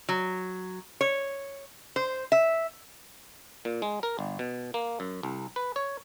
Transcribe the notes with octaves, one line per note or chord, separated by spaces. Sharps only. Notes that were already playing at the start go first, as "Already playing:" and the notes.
F#3
C#5
C5
E5
A#2
G#3
A#4
G1
B2
A#3
F#2
C2
B4
C#5